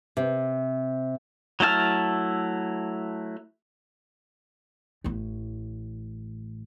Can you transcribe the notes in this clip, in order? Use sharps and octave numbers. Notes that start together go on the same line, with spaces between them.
C3
F#3 A3 E4 A5 F6
A1 A2